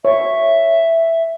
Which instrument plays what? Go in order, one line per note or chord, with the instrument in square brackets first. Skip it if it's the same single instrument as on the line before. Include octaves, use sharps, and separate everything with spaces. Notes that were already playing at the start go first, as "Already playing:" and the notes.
[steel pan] C#5 [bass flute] E5